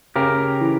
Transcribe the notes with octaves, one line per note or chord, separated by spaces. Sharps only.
C#3 G4 A#4
E3